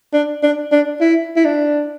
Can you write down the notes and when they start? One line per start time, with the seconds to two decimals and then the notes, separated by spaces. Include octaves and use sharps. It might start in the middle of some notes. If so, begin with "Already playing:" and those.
0.13 D4
0.43 D4
0.72 D4
1.00 E4
1.36 E4
1.45 D4